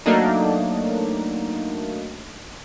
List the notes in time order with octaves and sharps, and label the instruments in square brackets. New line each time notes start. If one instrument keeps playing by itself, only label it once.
[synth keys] F#3 A3 A#3 D4 D#4